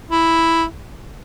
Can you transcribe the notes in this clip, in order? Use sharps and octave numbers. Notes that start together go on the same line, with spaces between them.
E4